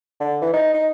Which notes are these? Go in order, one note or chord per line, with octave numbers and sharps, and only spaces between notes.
D3
E3
D#4
D#4